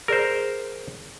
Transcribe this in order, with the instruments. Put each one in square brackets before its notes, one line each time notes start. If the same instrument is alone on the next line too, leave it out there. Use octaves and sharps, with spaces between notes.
[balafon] G#4 D5 [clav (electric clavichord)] A#4 C5